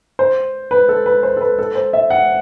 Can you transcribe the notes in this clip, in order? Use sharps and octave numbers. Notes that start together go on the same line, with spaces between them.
C5
B4
A4
B4
C5
A4
B4
A4
C5
E5
F#5